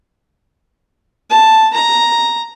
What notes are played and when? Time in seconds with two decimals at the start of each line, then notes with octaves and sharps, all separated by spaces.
1.30 A5
1.74 A#5